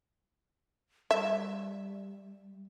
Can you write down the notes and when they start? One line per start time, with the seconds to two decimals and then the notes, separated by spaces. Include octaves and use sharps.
1.11 G3 E5